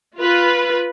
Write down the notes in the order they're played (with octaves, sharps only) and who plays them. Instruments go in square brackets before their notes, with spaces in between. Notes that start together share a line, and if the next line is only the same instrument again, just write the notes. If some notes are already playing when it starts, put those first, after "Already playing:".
[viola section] F4 B4